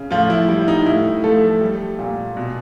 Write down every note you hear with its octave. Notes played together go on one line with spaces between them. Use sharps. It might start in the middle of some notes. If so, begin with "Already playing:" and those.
Already playing: C#3
A2 F3 F4
E4
G3 E4
D#4
A2 E4
F3 A3 A4
G3
A#2
B2